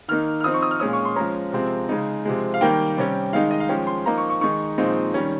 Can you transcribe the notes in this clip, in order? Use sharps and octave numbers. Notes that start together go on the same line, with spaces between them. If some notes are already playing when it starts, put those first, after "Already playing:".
D#3 A#3 D#4 F6
F6
F3 C4 D#4 D#6
C#6
D#6
F6
A#2 G#3 C#4 D#6
C#6
C6
F3 G#3 C#4 A#5
C3 F3 G#3 C4
C#3 G#3 D#4
C3 F3 G#3
F5
D#3 G3 A#3 G5
C3 G3 C#4
D#3 G#3 D#4 F5
D#5
F5
F3 G#3 C#4 G5
C6
F3 A#3 D#4 A#5
C#6
C#6
D#3 G#3 D#4 C#6
A#2 F3 G#3 C4 D#4
D#3 G3 C#4